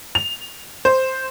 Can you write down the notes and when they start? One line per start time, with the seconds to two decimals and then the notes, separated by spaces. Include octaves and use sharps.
0.15 F7
0.85 C5